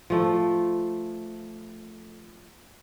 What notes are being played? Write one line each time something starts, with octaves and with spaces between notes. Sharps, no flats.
F3 A3